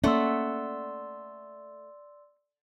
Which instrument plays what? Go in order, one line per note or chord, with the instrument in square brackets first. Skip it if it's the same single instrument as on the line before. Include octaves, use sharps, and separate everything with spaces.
[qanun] A3 F#5 [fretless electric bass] A#3 C#4 [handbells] D5 C6 E6